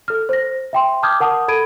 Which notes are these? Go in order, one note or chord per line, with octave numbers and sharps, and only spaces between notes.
A4 F6
C5 A#6
E5 G5 C6
A5 D6 D#6 F6 G6 G#6
A#4 F#5 A5 D#6
A4 B5 G#6 D7 D#7